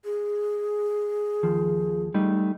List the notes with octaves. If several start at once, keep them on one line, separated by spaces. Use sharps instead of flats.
G#4
D#2 F3
G3 A3 D#4